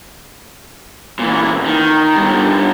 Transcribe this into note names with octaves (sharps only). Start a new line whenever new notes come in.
A#2 E3
D#3
G2 D3